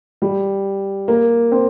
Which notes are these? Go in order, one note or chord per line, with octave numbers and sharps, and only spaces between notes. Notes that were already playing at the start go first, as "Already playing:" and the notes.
G3
A#3
C4